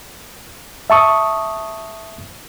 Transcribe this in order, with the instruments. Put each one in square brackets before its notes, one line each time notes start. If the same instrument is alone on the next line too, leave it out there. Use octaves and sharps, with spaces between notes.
[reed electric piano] E5 A5 C#6 D#6